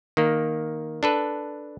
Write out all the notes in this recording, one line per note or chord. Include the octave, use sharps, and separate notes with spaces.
D#3 A#3
D4 A4 B4